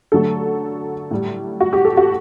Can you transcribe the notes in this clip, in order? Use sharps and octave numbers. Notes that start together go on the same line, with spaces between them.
D3 F#3 A3 A4
A2 G3
F#4
G4
A4
F#4